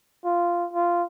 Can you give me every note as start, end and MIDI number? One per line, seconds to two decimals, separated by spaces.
0.25 0.66 65
0.73 1.03 65